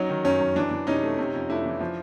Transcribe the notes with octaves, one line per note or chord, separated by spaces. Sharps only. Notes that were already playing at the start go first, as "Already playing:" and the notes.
Already playing: F#3 C#4 D#4
D#3
F#2 C#4
F#2
E3 D4
E3
C3 C#4 D#4
A3
C3
F2
A3 D4 E4
E3
F3